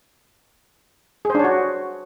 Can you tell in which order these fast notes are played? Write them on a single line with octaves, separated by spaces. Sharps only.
G#4 C5 D4 C#5 F#4